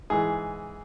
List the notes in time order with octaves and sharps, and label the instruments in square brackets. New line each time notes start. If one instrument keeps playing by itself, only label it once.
[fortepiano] G#2 E3 G#4